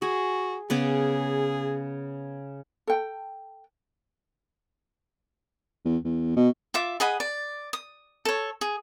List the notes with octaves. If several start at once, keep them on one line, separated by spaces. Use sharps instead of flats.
F#4 G#4
C#3 B3 G#4 D6
A4 G5
E2
E2
B2
F4 E5 D6
G#4 D#5 F#5 B5
D5
D#6
A4 C#5
G#4